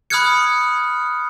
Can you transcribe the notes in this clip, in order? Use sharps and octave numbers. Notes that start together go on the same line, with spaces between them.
B5 D#6 F6 F#6 G#6 C#7